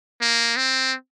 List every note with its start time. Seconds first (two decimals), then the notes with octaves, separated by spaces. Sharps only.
0.21 A#3
0.57 C4